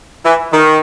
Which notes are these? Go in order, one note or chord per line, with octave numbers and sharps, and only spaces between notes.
E3
D#3